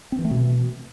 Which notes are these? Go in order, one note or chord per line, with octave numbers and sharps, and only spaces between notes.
C4
E3
A3
B2